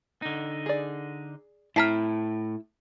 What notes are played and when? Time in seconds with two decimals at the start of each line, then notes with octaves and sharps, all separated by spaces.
0.22 D3 D#4
0.66 G#4 D5
1.76 A2 C4 E4 A5 A#5 F6 B6 C7